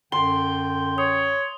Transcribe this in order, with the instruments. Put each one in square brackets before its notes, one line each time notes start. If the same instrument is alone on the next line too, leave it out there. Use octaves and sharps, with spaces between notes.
[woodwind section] F#2 D3 G5 [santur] C6 [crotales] G7
[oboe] C#5 [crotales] D#6